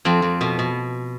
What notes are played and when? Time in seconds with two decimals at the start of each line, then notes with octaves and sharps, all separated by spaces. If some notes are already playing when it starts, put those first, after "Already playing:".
0.05 F2 C4
0.22 F2
0.41 B2 B3
0.59 B2